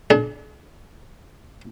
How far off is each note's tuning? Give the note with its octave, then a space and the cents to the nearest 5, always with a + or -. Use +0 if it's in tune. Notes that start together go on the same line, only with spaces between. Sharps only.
D4 +5 G#4 +45